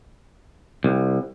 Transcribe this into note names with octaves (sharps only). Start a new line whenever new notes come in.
C2